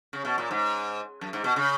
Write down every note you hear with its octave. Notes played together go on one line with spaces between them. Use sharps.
C#3
B2
A#2
G#2
F#2
G#2
B2
C#3